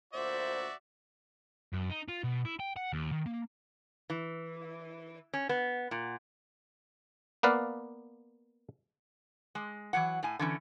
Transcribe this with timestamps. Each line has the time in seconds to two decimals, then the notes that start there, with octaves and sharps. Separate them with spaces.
0.13 D2 A#2 F#4 C5 D5 E5
1.74 F#2
1.90 D#4
2.09 F4
2.24 B2
2.45 E4
2.60 G5
2.76 F#5
2.93 D#2
3.12 D#3
3.26 A#3
4.10 E3
5.34 C#4
5.49 B3
5.91 A#2
7.43 A#3 B3 B4 D5 F5
9.55 G#3
9.93 E3 F#3 F#5
10.23 A2 G#5
10.39 D3 E3 C#4